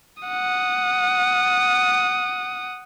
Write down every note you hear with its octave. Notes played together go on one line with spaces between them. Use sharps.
F#5 D#6